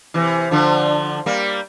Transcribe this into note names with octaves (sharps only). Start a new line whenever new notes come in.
C3 E3
D3 F3
G3 A#3